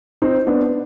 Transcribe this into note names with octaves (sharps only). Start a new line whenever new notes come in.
C4 D#4
B3 D4